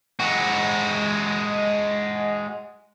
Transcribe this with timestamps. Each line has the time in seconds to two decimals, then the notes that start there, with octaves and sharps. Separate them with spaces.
0.20 G#3 F#4